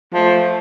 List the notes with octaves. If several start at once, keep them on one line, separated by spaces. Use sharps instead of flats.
F3 A3